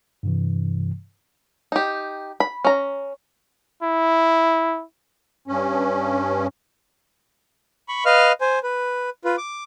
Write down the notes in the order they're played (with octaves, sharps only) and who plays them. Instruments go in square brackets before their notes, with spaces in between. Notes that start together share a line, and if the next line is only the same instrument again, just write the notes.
[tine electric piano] G2 C3 E3
[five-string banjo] D#4 G4
B5
C#4 A#5
[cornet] E4
[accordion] G2 C#4
[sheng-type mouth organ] B5 C#6
B4 D#5 F5 F6
C5 G#5
B4
F4 B4
D6